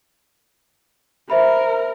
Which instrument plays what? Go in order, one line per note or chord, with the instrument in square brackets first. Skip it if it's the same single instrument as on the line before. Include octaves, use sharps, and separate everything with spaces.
[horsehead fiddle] A#4 [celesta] C5 E5 B5